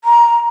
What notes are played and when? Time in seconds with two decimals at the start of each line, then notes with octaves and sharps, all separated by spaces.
0.04 A#5